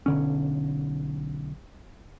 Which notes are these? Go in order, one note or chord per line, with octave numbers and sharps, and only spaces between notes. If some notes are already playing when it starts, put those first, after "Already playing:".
B1 D3 C#4